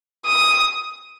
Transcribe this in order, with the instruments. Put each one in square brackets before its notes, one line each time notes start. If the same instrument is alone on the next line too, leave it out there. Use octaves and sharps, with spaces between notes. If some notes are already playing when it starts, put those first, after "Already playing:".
[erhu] D#6